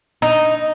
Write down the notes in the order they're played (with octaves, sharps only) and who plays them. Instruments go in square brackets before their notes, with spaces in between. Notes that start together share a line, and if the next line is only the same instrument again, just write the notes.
[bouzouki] D#4